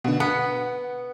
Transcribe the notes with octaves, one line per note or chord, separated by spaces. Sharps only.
B2 D3
B3 F#5